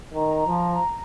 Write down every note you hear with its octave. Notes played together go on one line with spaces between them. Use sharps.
D#3 A#5
F3